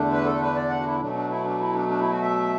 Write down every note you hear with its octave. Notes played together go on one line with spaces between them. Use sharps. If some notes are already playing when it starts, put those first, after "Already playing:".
Already playing: E2 D3 A3 D4
B4
A4
B4
D5
F#5
F#4
E4
B2 F#3 A3 D4
D4
E4
D4
E4
D4
D4
E4
F#4
E5